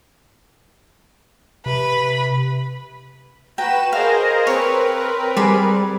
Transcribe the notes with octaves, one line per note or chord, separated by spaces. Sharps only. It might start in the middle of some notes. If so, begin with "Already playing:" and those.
C3 B4 B5
F#4 B4 G5 A#5 E7
G#4 A#4 C5 D#5 F5
C4 A#4 B4 C#5
G3 G#4 D5 B5